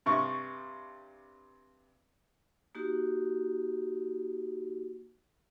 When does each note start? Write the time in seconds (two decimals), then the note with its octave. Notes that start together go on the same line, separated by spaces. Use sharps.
0.06 G2 C3 C#6
2.75 A#3 D#4 F#4 G4